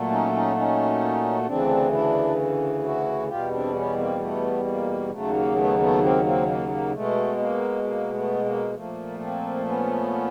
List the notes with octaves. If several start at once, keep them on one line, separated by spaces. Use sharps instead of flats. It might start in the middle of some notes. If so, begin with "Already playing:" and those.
Already playing: A#2 F#3 A3
C#4 D#4
C#4 D#4
C#4 D#4
D2 C#3 E3 C4 D4
D4 E4
E4 F#4
E2 B2 G3 F4 G4
C4 D4
B3 C#4
A#3 C4
A3 B3
A#3
D#2 C#3 F#3 A3
A#3
A3 B3
A3 B3
A#3 C4
A#3 C4
A#3
A#3
B2 G#3 A3
A#3
A#3
A3 B3
A#3
A#2 F3 A3 A#3
A#3 C4
B3 C#4